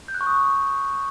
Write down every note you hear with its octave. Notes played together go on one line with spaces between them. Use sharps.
G6
F#6
C#6
D#6